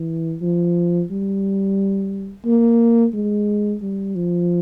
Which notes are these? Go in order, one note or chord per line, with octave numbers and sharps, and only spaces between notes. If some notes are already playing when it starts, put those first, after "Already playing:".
Already playing: E3
F3
G3
A#3
G#3
G3
F3